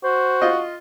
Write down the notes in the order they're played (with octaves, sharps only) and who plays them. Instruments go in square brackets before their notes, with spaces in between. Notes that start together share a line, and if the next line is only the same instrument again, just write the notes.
[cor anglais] F#4 [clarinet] C5
[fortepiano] F4 D#5